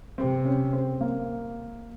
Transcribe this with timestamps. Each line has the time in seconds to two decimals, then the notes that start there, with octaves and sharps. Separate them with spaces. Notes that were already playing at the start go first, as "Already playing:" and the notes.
0.18 C3 C4
0.45 C#4
0.73 C4
1.01 A#3